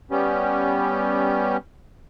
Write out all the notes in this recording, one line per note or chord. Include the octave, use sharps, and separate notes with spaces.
G3 B3 C#4 G4